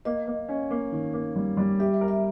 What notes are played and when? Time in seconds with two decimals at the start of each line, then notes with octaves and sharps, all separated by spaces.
0.05 A#3 D#5
0.27 A#3
0.49 C#4
0.71 A#3
0.92 D#3
1.13 A#3
1.36 G3
1.57 G3
1.79 G4 E5
1.94 E5
2.01 A#4
2.08 E5